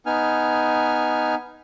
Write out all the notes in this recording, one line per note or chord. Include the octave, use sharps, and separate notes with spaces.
B3 D#4 G#5 F6